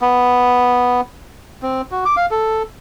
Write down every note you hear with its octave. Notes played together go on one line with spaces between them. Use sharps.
B3
C4
F#4
D6
F5
A4